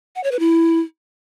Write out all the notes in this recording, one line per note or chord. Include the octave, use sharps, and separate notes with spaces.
F#5
C#5
B4
E4